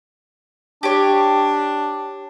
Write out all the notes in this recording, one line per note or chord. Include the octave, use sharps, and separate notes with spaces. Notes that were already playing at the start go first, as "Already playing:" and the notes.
D4 G4 C#5